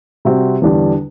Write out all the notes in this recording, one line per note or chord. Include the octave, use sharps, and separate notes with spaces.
C3 G3 C4 F#4
E2 D3 G3 D4